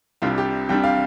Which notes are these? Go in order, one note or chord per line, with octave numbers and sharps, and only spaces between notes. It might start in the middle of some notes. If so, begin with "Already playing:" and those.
C2 C3 G3 D4 F4
G4
C2 C3 G3 D4 G5
F5